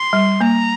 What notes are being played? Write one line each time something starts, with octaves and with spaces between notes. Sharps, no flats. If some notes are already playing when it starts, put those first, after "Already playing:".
Already playing: C6
G3
A#3 A#5